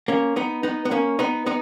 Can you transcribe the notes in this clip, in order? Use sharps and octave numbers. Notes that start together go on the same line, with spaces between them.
A#3 C#4
B3 D#4
B3 D#4
B3
A#3 C#4
B3 D#4
B3 D#4